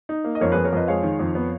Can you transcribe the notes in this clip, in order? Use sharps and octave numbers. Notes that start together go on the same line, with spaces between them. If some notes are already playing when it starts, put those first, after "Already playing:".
D#4
A#3
D#5
F2 A#4 C#5
F2 G#4 B4
A#4 C#5
F2 B4 D#5
G#3 C#5 F5
D#3
F2
B3